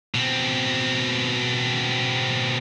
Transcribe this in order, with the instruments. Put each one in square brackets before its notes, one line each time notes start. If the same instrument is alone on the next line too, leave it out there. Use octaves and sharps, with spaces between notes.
[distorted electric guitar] B2 C4